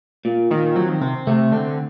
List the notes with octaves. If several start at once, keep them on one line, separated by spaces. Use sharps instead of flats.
A#2
A#2 D#3
F#3 C4
D#3
C3 C4
C3 A3
D3 C4